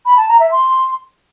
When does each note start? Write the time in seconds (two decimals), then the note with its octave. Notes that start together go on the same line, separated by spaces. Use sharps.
0.06 B5
0.17 A5
0.29 A#5
0.40 E5
0.51 C6